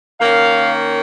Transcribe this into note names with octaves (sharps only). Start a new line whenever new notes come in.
D#3 A#3 C#4 F5